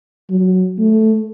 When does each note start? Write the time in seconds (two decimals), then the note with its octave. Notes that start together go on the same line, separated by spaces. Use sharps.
0.30 F#3
0.78 A3